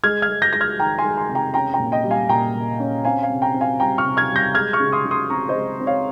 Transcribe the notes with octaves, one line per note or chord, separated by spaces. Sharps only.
G#3 F6 G#6
F6 G#6
G#3
G6 A#6
G#3 A#6
F6 G#6
D#3 G5 A#5
G#5 C6
G#3
G#5 C6
C3
G5 A#5
C#4 G5 A#5
G5 A#5
A#2
D#5 G5
G3
F5 G#5
A#2 G5 A#5
A#2
C#4
C4 F5 G#5
F5 G#5
C3
G5 A#5
C4
F5 G#5
G3 G5 A#5
C#6 F6
C3
F6 G#6
G3
G6 A#6
G#3 F6 G#6
C#6 F6
C#3
C6 D#6
C#3
C6 D#6
C4 A#5 C#6
C5 D#5
G#3
C4
C#5 F5